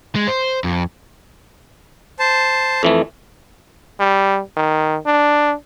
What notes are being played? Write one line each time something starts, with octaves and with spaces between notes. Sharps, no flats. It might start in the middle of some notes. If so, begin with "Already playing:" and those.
G#3
C5
F2
C5 A5
F2 E3 A3
G3
D#3
D4